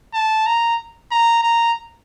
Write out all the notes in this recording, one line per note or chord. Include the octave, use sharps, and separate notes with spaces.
A5
A#5
A#5
A#5